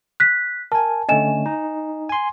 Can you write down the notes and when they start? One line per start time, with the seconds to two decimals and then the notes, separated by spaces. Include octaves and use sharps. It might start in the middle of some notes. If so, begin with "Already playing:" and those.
0.20 F#6 B6
0.72 A#4 G#5 A5
1.09 D3 A3 C#4 D#5 G#5 E7
1.46 D#4
2.09 G#5 C6